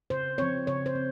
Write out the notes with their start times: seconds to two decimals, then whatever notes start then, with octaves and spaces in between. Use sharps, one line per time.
0.10 C#3 C5
0.38 F3 C4 C#5
0.67 C#3 C#5
0.86 C5
0.95 C4